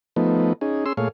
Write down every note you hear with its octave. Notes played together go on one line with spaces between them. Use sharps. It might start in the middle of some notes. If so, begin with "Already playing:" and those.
F3 A3 B3 D#4
C#4 D#4 G#4
C#4 G#4 C6 E6
A#2 A3 G#4 C#5 F5